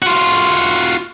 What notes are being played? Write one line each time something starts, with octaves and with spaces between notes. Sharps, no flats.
F4 F#4